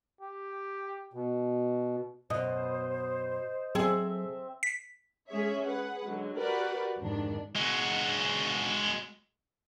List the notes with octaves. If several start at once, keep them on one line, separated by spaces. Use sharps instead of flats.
G4
B2
F#2 B2 C5 D#5
F#3 C4 G#4 A4 E5
B6
G#3 C#4 G#4 C#5 E5
G#4 B4 F#5
D3 F#3 G#3
F#4 G4 A#4 B4 D5 F#5
F2 G#2 D#3 D4
G#3 F#4